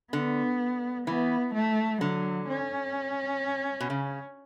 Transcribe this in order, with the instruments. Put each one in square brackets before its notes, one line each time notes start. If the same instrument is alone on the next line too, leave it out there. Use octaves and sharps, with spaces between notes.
[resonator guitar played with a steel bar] D3 [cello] B3
[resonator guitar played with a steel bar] E3 [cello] B3
[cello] A3
[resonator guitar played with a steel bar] D3 [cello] F#3
[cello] C#4
[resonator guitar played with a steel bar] B2
C#3